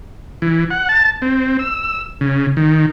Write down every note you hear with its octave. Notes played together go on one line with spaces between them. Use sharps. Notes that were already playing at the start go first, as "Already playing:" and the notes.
E3
F#5
A5
C4
E6
C#3
D#3